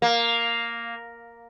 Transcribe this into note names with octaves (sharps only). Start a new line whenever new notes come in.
A#3